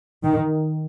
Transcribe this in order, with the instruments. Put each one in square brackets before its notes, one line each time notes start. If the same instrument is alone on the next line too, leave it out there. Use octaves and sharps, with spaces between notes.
[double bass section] D#3